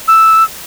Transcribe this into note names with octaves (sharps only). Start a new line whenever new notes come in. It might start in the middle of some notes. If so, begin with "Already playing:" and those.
E6